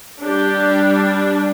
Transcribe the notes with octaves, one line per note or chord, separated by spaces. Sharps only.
G3 D4 G4